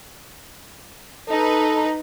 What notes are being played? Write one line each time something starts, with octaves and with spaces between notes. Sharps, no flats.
D#4 A4 B4